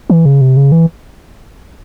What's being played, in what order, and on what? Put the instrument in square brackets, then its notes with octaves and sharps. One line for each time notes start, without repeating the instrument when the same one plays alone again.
[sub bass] E3
C#3
C3
C#3
E3